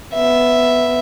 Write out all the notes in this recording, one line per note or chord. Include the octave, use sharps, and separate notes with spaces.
B3 E5